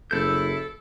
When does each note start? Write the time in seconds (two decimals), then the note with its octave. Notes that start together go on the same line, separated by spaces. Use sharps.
0.11 F#1 E4 A4 G6